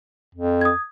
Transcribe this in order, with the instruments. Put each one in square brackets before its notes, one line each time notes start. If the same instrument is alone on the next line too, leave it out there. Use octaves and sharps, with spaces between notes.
[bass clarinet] F2
[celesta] D#6 G#6